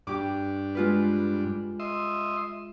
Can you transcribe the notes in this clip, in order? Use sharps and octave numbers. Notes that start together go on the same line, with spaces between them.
G2 D4 G4 D6
G#3 F4 B4
D#5 E5 C6